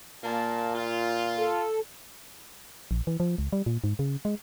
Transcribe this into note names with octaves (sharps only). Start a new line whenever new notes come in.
A#2 A#3 A5
F4
A4
A#1
E3
F3
C#2
G3
A#2
G#2
C#3
G#3